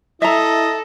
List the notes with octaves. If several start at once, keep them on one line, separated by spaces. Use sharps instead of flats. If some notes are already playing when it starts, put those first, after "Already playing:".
E4 A4 D#5 E5 A#5